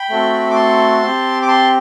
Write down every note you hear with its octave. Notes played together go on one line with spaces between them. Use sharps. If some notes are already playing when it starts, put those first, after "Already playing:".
Already playing: G5 B5
A3 C4 F#4 A4
D6
A5 C6
C4 G4
D6
A5 C6